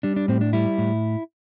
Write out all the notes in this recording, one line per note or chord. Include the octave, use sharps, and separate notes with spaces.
G3 D4
D4
A2 C4
D4
G3 E4
A2